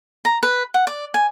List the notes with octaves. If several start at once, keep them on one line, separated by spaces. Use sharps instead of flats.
A#5
B4
F#5
D5
G#5